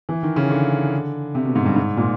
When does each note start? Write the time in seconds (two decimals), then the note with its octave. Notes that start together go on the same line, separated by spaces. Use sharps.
0.09 E3
0.23 D#3
0.36 C#3
0.50 D3
1.35 C3
1.45 B2
1.55 G#2
1.66 G2
1.76 G#2
1.97 A#2